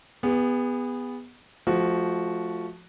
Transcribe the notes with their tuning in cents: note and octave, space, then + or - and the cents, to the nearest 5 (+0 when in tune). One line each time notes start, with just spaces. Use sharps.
B3 +0 G#4 -35
F3 +0 A3 -30 F#4 +0